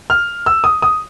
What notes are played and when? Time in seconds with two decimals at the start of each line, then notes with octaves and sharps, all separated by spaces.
0.10 F6
0.46 E6
0.64 D#6
0.82 D#6